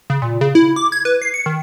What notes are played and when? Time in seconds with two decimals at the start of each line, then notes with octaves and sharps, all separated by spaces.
0.10 C#3
0.22 A#2
0.41 C#3
0.55 E4
0.76 D6
0.92 G#6
1.05 B4
1.22 C7
1.34 C#7
1.46 D#3